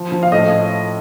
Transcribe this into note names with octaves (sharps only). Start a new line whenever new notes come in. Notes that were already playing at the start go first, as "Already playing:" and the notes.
Already playing: F3
F3
F5
A2 D#5